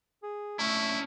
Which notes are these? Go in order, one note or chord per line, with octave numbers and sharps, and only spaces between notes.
G#4
A3 C#4 D4 E4